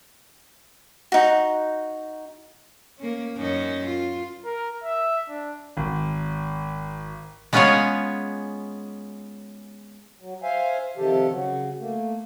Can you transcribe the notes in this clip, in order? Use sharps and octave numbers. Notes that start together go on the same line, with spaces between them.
D#4 F#4
A#3 C#4
F#2 C#4 D#4
F4
A#4
E5
D4
G#1
G#3 B3 C#4 F4 G#4 C#5
F#3
C5 E5 F5 G#5
C3 D#3 F3 G4 A4
C#3 F#3
A3 A#3